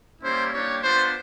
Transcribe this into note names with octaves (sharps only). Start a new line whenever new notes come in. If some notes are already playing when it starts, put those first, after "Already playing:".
G3 A#3 C#4 E4 C5
G3 A#3 D4 G4 C#5
B3 D4 F4 C5